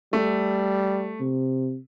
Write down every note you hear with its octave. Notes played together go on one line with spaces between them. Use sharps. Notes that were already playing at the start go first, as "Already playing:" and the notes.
G3 A3
C3